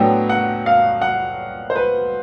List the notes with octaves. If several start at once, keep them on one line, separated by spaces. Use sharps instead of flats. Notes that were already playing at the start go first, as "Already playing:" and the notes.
Already playing: A2 F#3 B3 D4 G5
F#5
F5
F#5
C5
B4